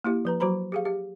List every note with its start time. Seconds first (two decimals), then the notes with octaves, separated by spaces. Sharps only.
0.04 A#3 E4 G4
0.25 F3 B4 A#5
0.40 F#3 F#4 C5 A#5 B5
0.72 G4 G#4 F5
0.85 G4